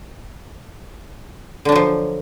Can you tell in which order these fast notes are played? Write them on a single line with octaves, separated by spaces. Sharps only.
D3 D4 F#3 F3